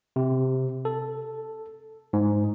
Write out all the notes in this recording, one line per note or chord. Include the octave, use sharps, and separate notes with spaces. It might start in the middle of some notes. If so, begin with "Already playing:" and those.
C3
A4
G#2